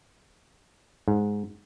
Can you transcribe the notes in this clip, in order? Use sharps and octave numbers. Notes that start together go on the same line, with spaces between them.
G#2